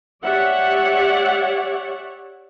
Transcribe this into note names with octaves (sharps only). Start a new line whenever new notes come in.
G4 C#5 D5 E5 F#5